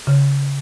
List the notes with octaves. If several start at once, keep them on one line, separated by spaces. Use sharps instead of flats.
C#3